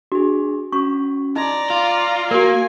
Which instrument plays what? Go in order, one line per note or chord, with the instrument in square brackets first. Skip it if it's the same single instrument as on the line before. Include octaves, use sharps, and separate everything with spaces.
[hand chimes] D4 G#4 [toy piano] F#4
[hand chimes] C#4 F#4 [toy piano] C#6
[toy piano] D#4 [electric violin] D5 A#5 [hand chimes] D#5 C6
[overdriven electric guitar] F4
[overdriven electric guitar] A#3 [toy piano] F#4 A#4 [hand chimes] F5 [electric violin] G#5